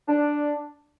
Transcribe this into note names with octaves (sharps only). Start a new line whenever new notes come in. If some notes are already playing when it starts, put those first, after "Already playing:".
D4